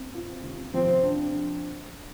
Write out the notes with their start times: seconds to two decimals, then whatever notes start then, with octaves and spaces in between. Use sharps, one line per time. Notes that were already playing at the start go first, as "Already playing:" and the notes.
Already playing: C4
0.15 F4
0.44 C3
0.74 F3 C4
1.03 D4